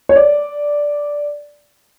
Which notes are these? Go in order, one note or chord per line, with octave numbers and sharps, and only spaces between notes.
C#5
D5